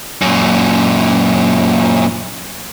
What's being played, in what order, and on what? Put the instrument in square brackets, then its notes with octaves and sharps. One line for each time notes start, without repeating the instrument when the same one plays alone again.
[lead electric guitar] F#2 A#2